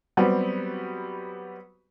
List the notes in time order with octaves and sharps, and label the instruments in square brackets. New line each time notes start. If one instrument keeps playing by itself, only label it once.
[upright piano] F#3 G3 B3 C4 G4